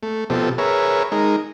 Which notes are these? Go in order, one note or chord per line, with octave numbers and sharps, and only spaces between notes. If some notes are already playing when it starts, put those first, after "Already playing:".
A3
B2 F3 C4 G4 A4
G#4 A#4 B4 C#5 E5
G#3 D#4 A#4